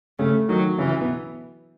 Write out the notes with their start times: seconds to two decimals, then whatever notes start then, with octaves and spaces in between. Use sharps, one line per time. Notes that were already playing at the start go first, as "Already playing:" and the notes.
0.19 C#3 A3 C#4
0.49 D#3 F#3 D#4
0.78 C#3 E3 C#4
1.01 B2 B3